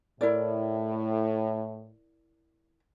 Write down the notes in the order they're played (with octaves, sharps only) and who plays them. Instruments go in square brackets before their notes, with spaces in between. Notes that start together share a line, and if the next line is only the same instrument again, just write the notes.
[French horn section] A2 [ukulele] E4 A#4 D5